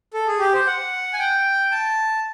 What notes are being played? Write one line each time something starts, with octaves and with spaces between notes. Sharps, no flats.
A4
G#4
G4
C5
F#5
G#5
G5
A5